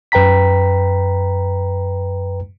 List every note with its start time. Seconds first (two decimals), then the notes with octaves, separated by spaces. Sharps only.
0.12 F#2 B4 G5 A#5 B6